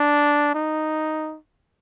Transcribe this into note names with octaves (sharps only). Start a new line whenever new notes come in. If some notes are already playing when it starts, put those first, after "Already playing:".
Already playing: D4
D#4